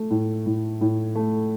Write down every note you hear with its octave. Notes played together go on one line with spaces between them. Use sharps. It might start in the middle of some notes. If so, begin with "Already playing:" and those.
Already playing: A3
A2
A2
A2
A3